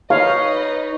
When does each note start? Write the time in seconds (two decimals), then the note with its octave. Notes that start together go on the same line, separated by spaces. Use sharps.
0.10 D#4 B4 C#5 D#5 F5